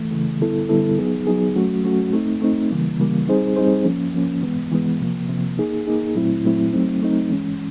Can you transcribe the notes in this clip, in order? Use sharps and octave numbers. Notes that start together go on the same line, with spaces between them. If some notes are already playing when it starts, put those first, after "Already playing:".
Already playing: E3 A3
C#3 E3 A3
D3 G3 B3 E4 A4
D3 G3 B3 E4 A4
F#3 B3 D#4 G#4
F#3 B3 D#4 G#4
F#3 A3 C#4 F#4
F#3 A3 C#4 F#4
A3 C4 D#4
A3 C4 D#4
C#3 E3 G3 A#3
C#3 E3 G3 A#3
G3 C4 D#4 G#4 C5
G3 C4 D#4 G#4 C5
F3 A#3 C#4
F3 A#3 C#4
E3 G#3 B3
E3 G#3 B3
C3 F3 A#3
C3 F3 A#3
A#3 D#4 G#4
A#3 D#4 G#4
A#2 F#3 A3 C4 E4
A#2 F#3 A3 C4 E4
F#3 A3 C4 D#4
F#3 A3 C4 D#4
E3 G#3 C#4